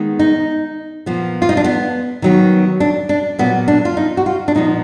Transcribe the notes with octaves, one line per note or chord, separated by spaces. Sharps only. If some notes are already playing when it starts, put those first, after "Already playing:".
Already playing: D#3 G#3 B3
D#4
A#2 F3 B3
F4
D#4
D4
B3
D#3 F#3 B3
D4
D4
A#2 F#3 A#3 B3
D4
F4
D#4
F#4
F4
D4
A#2 F3 B3 D#4